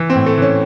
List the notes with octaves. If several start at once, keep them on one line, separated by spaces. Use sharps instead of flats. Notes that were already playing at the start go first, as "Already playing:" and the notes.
Already playing: E3
C4
A2
A3
E3 C#4